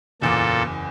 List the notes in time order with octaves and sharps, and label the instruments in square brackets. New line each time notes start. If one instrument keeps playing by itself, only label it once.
[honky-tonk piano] F#1 E2 D6 [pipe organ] A#2 A4